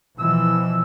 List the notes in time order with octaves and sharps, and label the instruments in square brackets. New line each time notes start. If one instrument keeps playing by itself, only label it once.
[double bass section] B2 E3 F3 [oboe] E6